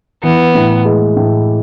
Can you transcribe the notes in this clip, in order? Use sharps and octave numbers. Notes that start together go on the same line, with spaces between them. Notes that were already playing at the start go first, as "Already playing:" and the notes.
E3 B3
A2
G#3
A2